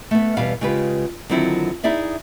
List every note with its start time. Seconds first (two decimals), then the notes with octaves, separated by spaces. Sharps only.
0.11 A3 B3
0.37 E2 B2 G3 B4 F5
0.61 C#3 G#3 F4 G4 B4
1.29 D3 D#3 F#3 C4 E4 F4
1.83 D#4 E4 G#4 D5 E5